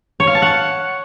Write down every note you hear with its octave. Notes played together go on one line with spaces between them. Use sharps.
C#5
F5
A5
F#5